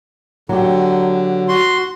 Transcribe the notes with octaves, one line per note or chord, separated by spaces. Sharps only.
D3 F#3 G4
F#4 C6